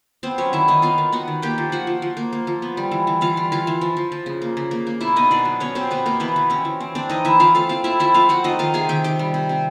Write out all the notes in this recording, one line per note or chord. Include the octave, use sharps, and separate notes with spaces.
B3 C4 C5
F#3 C#4 C#5
D#3 E4 E5
D#3 D#4 D#5
B3 F4 F5
D#3
B3 F#4 F#5
D#3
A#3 G4 G5
F3
F3 F#4 F#5
F3
F3
A#3
A#3
F3
B3
G3
E3
E3
E3 F4 F5
G3
E3 F4 F5
E3
F3
F3
F3
C#3
A#3
C#3
A#3
A#3
B2 E4 E5
B3 D#4 D#5
B2 D4 D5
F#3
B3 C#4 C#5
B2 C4 C5
B2 B3 B4
B2 A#3 A#4
E3 B3 B4
E3
C4 C#4 C#5
E3
C4
C4 D4 D5
E3 D#4 D#5
E3 E4 E5
C4 F4 F5
A3 F4 F5
C4 F4 F5
C4 E4 E5
F3 E4 E5
A3 F4 F5
C4 F#4 F#5
F3 D#4 D#5
D#3 F4 F5
C3 G#4 G#5
D#3 G4 G5
D#3 G4 G5
G3
C3
C3